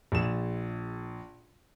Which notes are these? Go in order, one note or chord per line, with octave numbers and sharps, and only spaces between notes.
A#1 E7